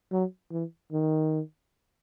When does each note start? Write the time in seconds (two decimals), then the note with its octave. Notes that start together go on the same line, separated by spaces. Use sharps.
0.12 F#3
0.51 E3
0.92 D#3